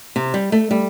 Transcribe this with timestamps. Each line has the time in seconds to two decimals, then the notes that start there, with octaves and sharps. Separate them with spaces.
0.16 C3
0.34 G3
0.52 A3
0.71 G3